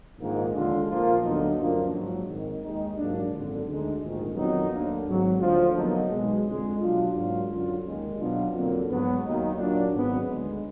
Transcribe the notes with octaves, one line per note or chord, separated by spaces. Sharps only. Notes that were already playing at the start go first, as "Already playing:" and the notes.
A#1 G#2 D#3 A#3
D#2 D3 G#3 D4 F4
A#2 F3 A#3 F4
D2 D3 F#3 B3 D#4
F#2 F3 A#3 D4 F4
A#1 G#2 F#3
G#1 G#2 D#3
D#2 D#3 G#3 D#4
A#1 G#2 F#3 A#3 D4
G#1 F#2 D3
D2 D3 G#3 D#4
A#1 G#2 D#3
F2 D#3 F#3 B3 D#4
D2 D3 F#3 A#3
G#1 G#2 F#3
D2 D3 F3
B1 B2 F#3 A#3 D#4
B1 B2 G#3
F2 D3 G#3
B2 F#3 D4 F4
G#2 F#3 A#3 D4 F4
F#2 D3 F#3 D4 F4
D#2 D#3 G#3
B2 F#3 D4 F4
F2 D3 F#3 A#3
G#2 F#3 B3
D#2 D#3 F#3 A#3 D#4
A#2 F#3 A#3 D4
G#1 G#2 F#3 B3
D2 D3 G#3